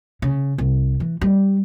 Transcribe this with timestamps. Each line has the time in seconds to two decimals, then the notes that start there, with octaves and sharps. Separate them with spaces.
0.22 C#3
0.58 C2
1.00 E3
1.21 G3